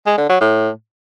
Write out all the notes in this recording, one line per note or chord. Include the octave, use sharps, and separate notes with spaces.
G#3
D3
F#3
A2